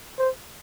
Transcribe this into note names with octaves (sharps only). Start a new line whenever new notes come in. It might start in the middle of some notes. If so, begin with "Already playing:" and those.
C5